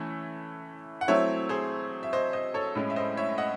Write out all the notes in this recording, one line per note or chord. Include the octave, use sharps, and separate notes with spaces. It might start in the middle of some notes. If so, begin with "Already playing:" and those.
Already playing: E3 A3 C#4 E4
F#5
F#3 A3 C4 E4 C#5 E5
G#4 C5
E5
C5 D#5
C5 D#5
A4 C#5
A2 G#3 C#4
E5
C5 D#5
C#5 E5
D#5 F#5